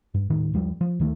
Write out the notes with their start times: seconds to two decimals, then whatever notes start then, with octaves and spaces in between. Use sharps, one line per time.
0.14 G2
0.30 D#1 A2 D#3
0.54 D#2 F3 G3
0.81 F3
1.00 D2 D#3 A3